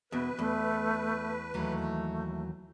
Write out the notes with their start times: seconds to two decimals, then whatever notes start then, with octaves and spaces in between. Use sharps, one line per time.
0.12 E2 B2 B4
0.39 E2 A3
1.54 D#2 E3 F#3 A3